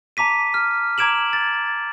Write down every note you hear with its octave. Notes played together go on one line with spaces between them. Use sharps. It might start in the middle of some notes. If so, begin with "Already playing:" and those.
A5 A#5 D6 B6 D#7
F6
A#5 D6 G#6 D7 E7 F#7
A6